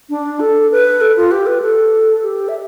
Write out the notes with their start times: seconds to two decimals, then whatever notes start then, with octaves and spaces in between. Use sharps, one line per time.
0.10 D4
0.40 A4
0.71 B4
1.01 A4
1.17 F4
1.31 G4
1.47 B4
1.62 A4
2.23 G4
2.48 E5